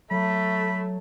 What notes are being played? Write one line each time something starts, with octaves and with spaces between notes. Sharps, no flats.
F#3 A3 B5